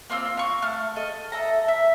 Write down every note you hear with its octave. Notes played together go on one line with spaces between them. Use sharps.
A#3 C4 F4 E6
F5 C#6
A3 F6
A4 D#5
A4 E5 A#5
E5